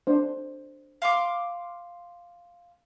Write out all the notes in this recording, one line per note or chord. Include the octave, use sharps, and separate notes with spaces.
D4 C5
F5 C6 D6